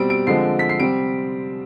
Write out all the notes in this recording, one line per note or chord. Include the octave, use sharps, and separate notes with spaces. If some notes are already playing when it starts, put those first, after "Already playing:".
Already playing: B2 G3 C4 D7
D7
D3 F3 G#3 C4 C7
B6
C7
C3 G3 C4 D7